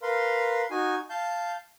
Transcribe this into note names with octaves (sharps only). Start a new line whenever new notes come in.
A#4 B4 F5 C6
D#4 F#4 G#5
F5 A5 G6